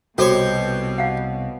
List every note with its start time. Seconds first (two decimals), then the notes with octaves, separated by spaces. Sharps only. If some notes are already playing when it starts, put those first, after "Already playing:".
0.18 C2 B2 F#4 G4 A4 C5 C#5
0.98 F5 F#5